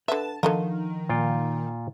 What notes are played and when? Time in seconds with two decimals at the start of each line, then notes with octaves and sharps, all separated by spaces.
0.08 D3 B4 E5 A5
0.43 D3 D#3 F3 A4 A#4 D#5 F5
1.09 A#2 F4 G5